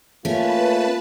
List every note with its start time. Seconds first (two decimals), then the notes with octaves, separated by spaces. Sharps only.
0.25 A3 A#3 C#4 F4 B4 A5